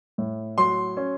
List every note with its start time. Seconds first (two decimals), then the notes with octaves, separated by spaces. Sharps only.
0.18 A2
0.58 F#3 C6
0.97 C#4